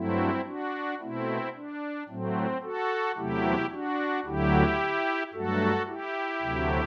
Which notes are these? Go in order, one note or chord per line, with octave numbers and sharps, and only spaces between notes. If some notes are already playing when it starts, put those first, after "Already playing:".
Already playing: G2 F#3 A3 C4 E4
D4 F#4
B2 A3 C4 E4
D4
A2 F#3 A3 C4
F#4 A4
E2 C3 F#3 A3 E4 G4
D4 F#4
D2 D3 F#3 E4 G4
G2 F#3 A3 F#4 A4
E4 G4
D2 C3 F#3 A3